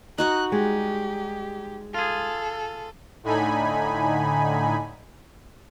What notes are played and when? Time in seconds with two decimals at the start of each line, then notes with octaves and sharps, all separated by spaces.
0.18 D#4 F#4 F#5 F#6
0.51 G3 G#3 G4
1.94 F4 G#4 A4
3.23 A2 D3 D#4 G#5 B5